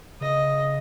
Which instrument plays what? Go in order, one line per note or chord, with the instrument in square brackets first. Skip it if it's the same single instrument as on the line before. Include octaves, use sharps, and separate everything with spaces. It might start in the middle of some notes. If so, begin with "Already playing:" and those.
[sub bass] C#3 [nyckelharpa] D#5